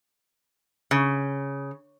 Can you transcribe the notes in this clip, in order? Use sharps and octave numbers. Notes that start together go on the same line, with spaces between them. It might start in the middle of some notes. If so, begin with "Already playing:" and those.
C#3